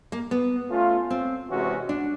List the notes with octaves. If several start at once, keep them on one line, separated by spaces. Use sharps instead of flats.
A#3
B3
A3 C#4 F4
C4
C3 E3 G#3 C#4 F#4
D4